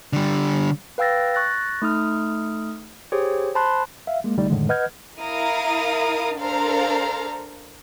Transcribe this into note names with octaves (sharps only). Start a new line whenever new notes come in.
D3 G3
B4 F5 G5 E6 A6 A#6
C#6 F#6 A6 A#6
A3 D#4 D#6 F6
G4 G#4 C5 C#5
C5 A5 B5 C6 F#6
E5 F5
G#3 A#3
C2 D3 G3 A3 D#4 D5
F2 A2 D3 D#3 G#3
B4 D#5 F#5 F6 G6 G#6
E4 A#4 F5 A#5 D#6
D4 A4 A#4 C5 F5 A#5